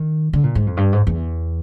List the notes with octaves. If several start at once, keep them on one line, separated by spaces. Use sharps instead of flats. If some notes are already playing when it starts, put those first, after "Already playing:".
Already playing: D#3
D3
A#2
G#2
F2
G2
G#2
E2